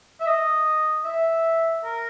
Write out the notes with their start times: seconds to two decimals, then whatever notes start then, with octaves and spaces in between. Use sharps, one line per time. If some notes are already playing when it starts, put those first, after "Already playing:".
0.20 E5
0.27 D#5
1.05 E5
1.84 A#4